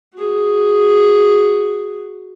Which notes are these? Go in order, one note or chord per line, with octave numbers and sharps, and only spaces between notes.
F#4 G#4